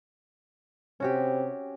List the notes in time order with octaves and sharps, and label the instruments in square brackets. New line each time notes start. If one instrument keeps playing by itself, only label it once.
[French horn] C3 [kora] C#4 F#4 G4